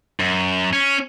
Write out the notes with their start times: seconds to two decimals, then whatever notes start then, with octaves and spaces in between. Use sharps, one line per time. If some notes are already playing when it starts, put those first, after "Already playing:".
0.20 F#2
0.73 C#4